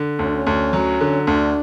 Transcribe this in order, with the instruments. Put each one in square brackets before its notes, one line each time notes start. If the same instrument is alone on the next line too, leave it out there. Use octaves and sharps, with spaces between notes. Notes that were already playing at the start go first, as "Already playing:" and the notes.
Already playing: [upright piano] D3
[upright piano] D2 [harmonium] C#4
[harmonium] D4
C#4
[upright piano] D2
F#3
D3
[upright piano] D2 [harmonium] D4